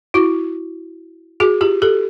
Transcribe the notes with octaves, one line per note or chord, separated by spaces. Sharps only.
E4 F#4
F#4 G#4
F4 G4
G4 A4